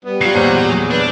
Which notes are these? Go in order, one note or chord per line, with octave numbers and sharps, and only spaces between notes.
G3 B3
F#3 F4 C7
E2 A#2 C5 C#5 F#5 D#7
G#4
E3 D4 B4 D5